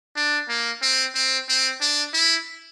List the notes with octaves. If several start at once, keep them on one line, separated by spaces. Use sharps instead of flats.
D4
A#3
C4
C4
C4
D4
E4